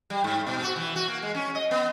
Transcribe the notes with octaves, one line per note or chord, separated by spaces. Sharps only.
G3
G#2
B2
F#4
E3
F#4
A#3
G#3
C#4
D#5
B3